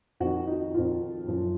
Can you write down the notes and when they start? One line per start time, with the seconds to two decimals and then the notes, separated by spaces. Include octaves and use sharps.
0.20 F2 D#3 F#4
0.47 D#4
0.74 F2 D#3 F4
1.27 F#2 F3